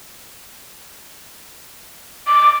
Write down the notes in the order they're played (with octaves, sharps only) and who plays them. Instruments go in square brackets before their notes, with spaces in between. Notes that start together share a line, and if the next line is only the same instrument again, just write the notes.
[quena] D6